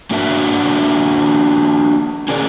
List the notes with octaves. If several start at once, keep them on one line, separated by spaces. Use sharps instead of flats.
A#3 D4 F#4 A#4 E5
C#4 G#4 A#4 D5